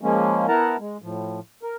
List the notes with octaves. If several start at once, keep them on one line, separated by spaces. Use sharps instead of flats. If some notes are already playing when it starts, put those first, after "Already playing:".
F3 G#3 A#3 C#4
B3 E4 A#4 F#5 A5 A#5
G#3
A2 F3
A#4